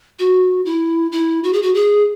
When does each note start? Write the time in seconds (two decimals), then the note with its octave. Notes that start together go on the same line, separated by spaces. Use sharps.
0.19 F#4
0.65 E4
1.12 E4
1.44 F#4
1.53 G#4
1.62 F#4
1.74 G#4